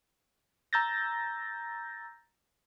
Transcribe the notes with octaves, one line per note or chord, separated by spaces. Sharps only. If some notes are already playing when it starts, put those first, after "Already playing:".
A#5 E6 G6 A6 A#6